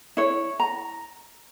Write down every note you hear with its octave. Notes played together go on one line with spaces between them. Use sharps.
E4 C#5
A#5